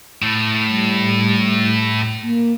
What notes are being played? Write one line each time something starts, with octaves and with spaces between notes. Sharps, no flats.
A2
G3
A#3